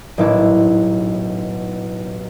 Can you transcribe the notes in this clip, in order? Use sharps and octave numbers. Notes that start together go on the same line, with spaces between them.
D#1 B1 A2 E4 D6 F#6